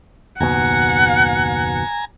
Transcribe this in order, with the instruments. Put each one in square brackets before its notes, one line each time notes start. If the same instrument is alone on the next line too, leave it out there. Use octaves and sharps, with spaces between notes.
[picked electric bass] F#1 D#2 B2 [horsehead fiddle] F#5 [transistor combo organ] G#5 A#5